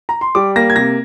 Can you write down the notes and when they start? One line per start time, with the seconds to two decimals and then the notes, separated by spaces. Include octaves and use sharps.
0.09 A#5
0.21 C6
0.35 G3 D6
0.56 A#3 A#6
0.70 G#6
0.76 C3 A#6